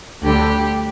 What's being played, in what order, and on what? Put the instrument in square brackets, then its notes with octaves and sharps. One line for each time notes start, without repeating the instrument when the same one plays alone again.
[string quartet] D2 D3 G3 G4